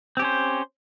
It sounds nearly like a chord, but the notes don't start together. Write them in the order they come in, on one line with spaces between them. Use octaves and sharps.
C4 G4 C#4 C5